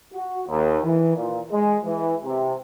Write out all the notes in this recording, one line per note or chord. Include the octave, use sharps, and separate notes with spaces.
F#4
D#2
E3
A#2
G#3
E3
C3